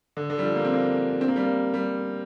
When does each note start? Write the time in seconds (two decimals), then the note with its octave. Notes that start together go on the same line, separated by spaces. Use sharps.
0.17 D3
0.30 D3
0.38 G3
0.43 F3
0.56 A#3
0.64 C4
0.73 A#3
1.21 C4
1.28 A#3
1.36 G3
1.43 A#3
1.74 G3